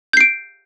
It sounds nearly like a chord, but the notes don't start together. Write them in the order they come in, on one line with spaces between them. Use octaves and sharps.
G6 C7 D7